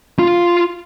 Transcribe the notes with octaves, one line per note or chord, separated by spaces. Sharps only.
F4 F5